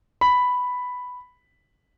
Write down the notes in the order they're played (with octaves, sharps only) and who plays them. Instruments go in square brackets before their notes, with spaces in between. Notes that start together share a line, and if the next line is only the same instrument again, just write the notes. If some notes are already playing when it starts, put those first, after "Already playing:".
[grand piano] B5